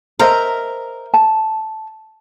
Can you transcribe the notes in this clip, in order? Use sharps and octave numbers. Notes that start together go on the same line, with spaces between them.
A#4 C5 D#5 E5
A5